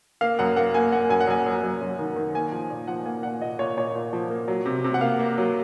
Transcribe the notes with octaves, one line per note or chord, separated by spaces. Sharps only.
A#3 F5
F#2 F#5
A#3 F#5
A#3 G#5
A#3 F#5
F#2 G#5
F#5
F#2 G#5
F#2
F#2
F#2
D#3
D#3
A#3 G#5
F3
A#2
F3 F#5
A#3 G#5
A#2 F#5
A#2 D#5
A#2 C#5
A#2 C#5
A#2
F3
A#3
F#3
C3
C3
F#5
A#3 F5
A#3
F#3